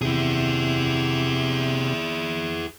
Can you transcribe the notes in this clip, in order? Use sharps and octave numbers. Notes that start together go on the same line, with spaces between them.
C3 E4 G#4